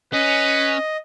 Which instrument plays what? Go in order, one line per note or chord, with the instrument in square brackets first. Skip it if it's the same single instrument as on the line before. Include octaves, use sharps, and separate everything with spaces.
[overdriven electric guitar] C#4 [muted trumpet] B4 [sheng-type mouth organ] D#5